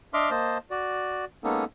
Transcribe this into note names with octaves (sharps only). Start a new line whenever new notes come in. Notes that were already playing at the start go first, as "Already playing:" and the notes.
D4 D#5 E5 C6 D6 F6
A#3 C5 D#5 A5
F#4 D5
G#3 A#3 B3 C#4 D#4 A4